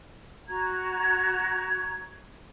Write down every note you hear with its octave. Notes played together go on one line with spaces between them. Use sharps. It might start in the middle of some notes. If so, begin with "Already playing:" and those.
F#4 A#5 G#6